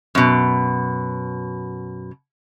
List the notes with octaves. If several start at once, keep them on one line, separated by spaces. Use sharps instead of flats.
F#2 B2